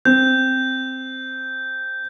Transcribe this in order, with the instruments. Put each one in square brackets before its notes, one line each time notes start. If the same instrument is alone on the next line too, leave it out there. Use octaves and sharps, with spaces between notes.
[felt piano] C4 [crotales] G6